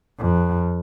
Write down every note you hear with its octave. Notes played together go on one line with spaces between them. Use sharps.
F2